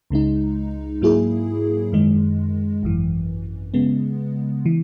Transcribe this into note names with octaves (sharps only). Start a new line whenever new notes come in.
C#2 C#3 G#3 D#4
G#2 F#3 A#3 E4 G#4
F#2 D#3 G#3
G#1 F#2 E3
C#3 G#3 B3
E3